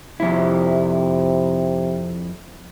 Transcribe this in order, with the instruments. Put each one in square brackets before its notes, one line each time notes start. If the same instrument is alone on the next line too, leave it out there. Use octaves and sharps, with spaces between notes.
[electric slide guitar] F2 E4 [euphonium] C3